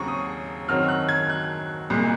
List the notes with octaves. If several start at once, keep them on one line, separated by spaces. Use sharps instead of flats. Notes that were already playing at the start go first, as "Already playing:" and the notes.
Already playing: D#2 C#3 F#3 C4 A#5 C#6
D#6
F#2 D#3 F#3 C4 F6
F#6
G#6
F#6
C2 A#2 G#3